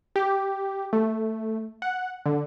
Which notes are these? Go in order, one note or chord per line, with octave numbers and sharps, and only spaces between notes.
G4
A3
F#5
D3